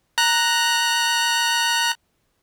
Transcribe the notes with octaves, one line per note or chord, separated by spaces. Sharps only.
A#5 F#6